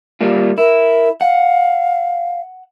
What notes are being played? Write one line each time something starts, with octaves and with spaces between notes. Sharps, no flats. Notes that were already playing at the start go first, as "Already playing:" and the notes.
G3 A#3 F4
E4 A#4
F5 F#5